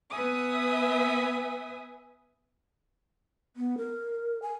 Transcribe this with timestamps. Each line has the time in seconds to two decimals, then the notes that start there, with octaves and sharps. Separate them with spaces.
0.11 B3 B4 E5 G#5 D#6
3.56 B3
3.78 A#4
4.42 G#5